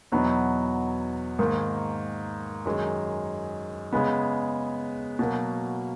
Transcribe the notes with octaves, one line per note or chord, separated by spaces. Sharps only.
E2 B2 F#3 B3 D#4
G#2 D#3 A#3
F#2 D#3 G#3
C#3 G#3 B3
B2 F#3 A#3